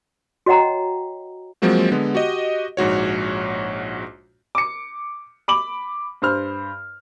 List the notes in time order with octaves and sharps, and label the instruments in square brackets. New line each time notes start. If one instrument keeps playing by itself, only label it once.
[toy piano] F#4 C#5 D#5 F#5 G5 A#5
[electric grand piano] F3 F#3 G#3 A#3 C4 F#4
D3 G#3 B3
F#4 G4 D#5
A#1 G#2 F#4 C#5
[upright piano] D6 C#7
B5 D6 F#7
G2 C5 F6